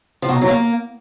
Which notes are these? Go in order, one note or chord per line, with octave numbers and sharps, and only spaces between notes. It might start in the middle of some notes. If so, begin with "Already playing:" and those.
F3
B2
D#4
F#3
A#3